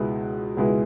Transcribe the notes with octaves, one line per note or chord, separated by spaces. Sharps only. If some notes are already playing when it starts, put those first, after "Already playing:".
Already playing: C#2 B2 G#3 E4 B4
C#2 B2 G#3 E4 B4